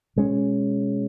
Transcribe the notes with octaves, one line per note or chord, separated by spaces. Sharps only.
B2 G#3 C#4